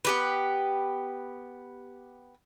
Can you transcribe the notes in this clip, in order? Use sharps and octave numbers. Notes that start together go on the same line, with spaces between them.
B3 G4 B4